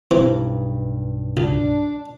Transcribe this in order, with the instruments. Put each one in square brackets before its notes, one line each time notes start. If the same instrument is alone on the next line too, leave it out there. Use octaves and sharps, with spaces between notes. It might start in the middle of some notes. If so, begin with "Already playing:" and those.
[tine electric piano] B1 G2 [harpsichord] E3 C4
[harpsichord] C#2 [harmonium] D4